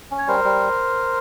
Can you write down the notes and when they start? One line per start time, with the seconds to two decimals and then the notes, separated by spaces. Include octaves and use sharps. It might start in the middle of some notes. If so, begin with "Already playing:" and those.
0.11 C#4
0.18 C#5
0.27 G3 A#4 C5
0.44 G3